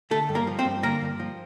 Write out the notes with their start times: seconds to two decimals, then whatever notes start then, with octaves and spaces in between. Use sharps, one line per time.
0.11 D3 A3 A4
0.29 G2
0.35 A#3 A#4
0.47 F3
0.59 C4 C5
0.65 G2
0.83 D3 A#3 A#4
1.02 G2
1.20 F3